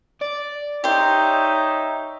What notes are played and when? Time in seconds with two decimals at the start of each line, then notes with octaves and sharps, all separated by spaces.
0.21 D5
0.84 D#4 G4 C5 C#5 E5